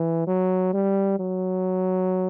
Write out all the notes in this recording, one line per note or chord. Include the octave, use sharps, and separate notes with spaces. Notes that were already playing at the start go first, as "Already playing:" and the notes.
Already playing: E3
F#3
G3
F#3